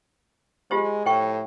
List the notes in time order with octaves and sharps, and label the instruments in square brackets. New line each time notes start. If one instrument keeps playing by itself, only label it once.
[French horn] G#3 [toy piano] F4 G4 C5
[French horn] A2 [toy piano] C5 G5 C#6